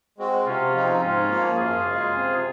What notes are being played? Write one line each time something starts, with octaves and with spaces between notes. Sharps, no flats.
G#3 C4 F#4
C3 C#4 F4
F3 C4 D#4
G#2 C#4 F4
F3 A#3
F#2 F4 G#4
C#3 G#3
C3